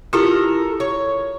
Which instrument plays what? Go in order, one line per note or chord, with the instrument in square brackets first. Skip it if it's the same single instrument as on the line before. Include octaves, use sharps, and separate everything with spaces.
[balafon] E4 F4 G4 [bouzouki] A4 A#4
[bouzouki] C#5